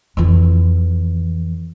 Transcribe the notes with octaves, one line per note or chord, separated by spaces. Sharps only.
F2 E3